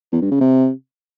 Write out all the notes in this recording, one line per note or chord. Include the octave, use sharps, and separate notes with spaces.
E2
G2
C#3
C3